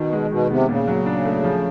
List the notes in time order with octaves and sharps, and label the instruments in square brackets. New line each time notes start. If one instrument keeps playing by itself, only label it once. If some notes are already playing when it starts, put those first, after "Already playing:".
Already playing: [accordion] B2 [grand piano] D#3
[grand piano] G#3
[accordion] B2 [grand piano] D#3
[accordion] C3 [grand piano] B3
[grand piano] A#2 [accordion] C#3
[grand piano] F#3
D4
A3
F3